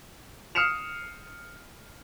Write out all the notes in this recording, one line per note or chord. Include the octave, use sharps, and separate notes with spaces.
D#6 F6 C7 C#7 E7 F7